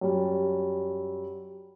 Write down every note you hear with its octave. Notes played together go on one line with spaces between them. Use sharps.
F#2 G3